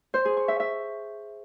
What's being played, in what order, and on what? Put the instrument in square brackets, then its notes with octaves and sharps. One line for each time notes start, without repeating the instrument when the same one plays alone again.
[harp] C5
G#4
C#6
E5
E5